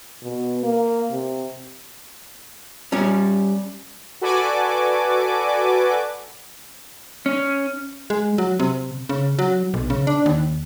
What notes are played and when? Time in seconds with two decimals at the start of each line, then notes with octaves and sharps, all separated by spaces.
0.22 B2
0.63 A#3
1.11 C3
2.92 G3 C#4
4.21 F#4 A4 B4 D5 G#5 D6
7.26 C#4
8.10 G#3
8.38 F#3
8.60 C3
9.09 C#3
9.39 F#3
9.74 B1
9.90 C#3
10.07 D4
10.26 D#2